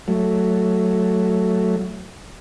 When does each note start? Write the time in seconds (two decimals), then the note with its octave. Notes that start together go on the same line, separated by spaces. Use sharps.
0.08 F#3 A3